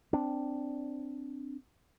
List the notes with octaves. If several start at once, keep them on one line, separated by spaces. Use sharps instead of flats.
C4 D4